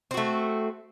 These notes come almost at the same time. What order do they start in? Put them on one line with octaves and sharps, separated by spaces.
C4 F#4 A3